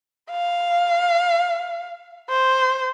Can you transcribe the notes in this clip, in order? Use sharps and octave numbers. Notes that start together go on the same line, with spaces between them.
F5
C5